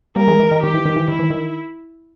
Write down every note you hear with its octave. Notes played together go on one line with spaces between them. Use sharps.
G3 A#3 A#4
E3 G#3
E3
D#3
D#3 G4
E3
D#3
E3
D#3 E4
E3
D#3